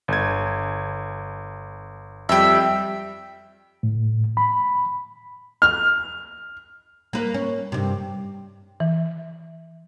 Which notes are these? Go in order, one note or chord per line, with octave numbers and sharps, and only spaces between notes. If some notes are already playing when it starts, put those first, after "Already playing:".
G1 G#6
F2 G3 E5 G5
A2
B5
F6
A#3 B4
C#4
G2 C3
E3